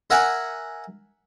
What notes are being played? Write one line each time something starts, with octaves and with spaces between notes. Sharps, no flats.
A#4 E5 F#5 G#5